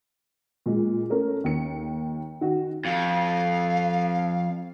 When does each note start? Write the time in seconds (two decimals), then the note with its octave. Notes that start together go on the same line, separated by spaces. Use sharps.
0.66 A#2 G#3
1.10 A3 C#4 A#4
1.44 D#2 C#7
2.41 D#3 F#4
2.85 F2 F5